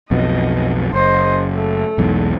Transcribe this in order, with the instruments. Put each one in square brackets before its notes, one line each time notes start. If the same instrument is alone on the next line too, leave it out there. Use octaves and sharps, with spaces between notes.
[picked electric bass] B1 F2 B2 [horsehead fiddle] D#5
[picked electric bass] F#1 [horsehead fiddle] C5 D#5
[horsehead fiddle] A3
[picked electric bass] B1 E2 G#2